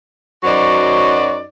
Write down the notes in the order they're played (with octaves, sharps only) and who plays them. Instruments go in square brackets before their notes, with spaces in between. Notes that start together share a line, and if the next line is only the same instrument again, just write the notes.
[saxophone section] F#2 F#3 D#4 F#4 C5 D5